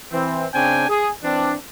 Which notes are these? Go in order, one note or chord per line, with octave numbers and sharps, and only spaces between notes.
E3 C4
C#3 C4 D4 G5 G#5
G#4
E3 C4 D4